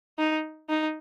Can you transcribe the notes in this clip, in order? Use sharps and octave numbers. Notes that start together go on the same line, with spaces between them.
D#4
D#4